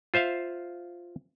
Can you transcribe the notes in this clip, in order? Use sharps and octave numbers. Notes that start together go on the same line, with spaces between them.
F4 C5 E5 F5